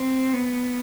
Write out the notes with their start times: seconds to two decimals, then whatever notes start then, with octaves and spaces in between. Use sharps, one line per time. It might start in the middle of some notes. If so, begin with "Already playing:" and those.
Already playing: C4
0.33 B3